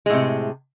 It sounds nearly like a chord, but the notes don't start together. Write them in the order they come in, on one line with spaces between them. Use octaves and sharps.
G#3 A2 C3